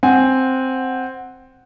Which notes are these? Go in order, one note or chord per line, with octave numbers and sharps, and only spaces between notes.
C4 F#5 G#5